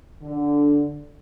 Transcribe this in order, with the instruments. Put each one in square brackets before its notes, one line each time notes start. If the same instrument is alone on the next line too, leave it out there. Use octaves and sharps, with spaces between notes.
[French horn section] D3